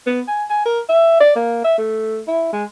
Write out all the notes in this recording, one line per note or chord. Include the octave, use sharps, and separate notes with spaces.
B3
G#5
G#5
A#4
E5
D5
A#3
E5
A3
E4
G#3